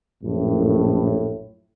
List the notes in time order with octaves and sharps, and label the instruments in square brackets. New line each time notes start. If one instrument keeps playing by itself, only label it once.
[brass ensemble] A#1 F#2 A2